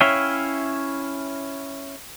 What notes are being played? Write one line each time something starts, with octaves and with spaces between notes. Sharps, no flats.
C#4 E4 C#5 E5 F5 G5